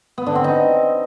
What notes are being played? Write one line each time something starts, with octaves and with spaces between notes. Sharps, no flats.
B3
D3
C4
D#4